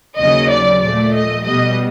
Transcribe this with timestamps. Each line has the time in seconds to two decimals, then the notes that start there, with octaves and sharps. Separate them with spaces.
0.18 D#2 C#3 F#3 D#5
0.50 D5
0.82 A#2 F3 A3 D5
1.14 D#5
1.45 B2 G3 B3 D#5